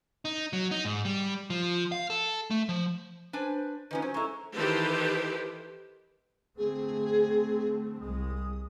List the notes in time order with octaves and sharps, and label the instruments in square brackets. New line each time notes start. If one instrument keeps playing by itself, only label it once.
[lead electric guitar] D#4
F#3
D#4
G#2
G3
F3
F5
A4
A3
F3
[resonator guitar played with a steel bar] D4 B4 G#5 [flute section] C5
[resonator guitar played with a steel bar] D#3 F3 C#4 [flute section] D#4 B4 G#5
[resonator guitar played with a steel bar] F#3 C#4 [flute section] C5
[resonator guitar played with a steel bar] G#3 E4 [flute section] A4 A#5 C#6
[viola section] D#3 E3 G4 A4 B4 C5
[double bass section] D3 A3 C4 [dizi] G#4
[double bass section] C2 G#3 [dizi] D#6